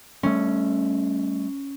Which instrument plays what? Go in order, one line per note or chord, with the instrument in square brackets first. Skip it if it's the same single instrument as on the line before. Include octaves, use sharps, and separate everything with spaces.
[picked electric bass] G3 A3 [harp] C#4